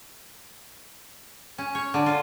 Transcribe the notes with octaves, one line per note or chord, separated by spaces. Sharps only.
C#4
C#5
D3
F4